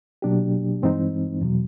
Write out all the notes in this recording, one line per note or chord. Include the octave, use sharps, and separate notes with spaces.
B2 F#3 A#3 D4 G4
G2 E3 G#3 C4 D#4
E2 B2 F#3